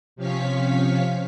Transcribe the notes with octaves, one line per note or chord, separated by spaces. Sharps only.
C3 F3 C#4 F5 C#6 B6